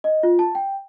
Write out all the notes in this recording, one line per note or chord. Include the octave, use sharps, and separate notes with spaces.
D#5
F4
A5
G5